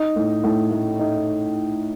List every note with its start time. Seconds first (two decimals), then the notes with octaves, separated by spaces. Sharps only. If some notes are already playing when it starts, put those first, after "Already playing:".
Already playing: D#4
0.16 A2
0.44 A2
0.71 A3
1.00 D#4